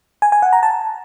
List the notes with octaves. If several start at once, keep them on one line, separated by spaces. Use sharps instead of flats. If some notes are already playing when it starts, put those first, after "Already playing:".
G#5
G#5
F#5
A#5
A5